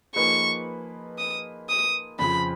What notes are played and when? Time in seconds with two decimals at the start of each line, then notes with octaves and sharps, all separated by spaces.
0.15 F3 A#3 D#4 G#4 B4 C#6
1.18 D#6
1.69 D#6
2.19 F2 C#3 F3 B5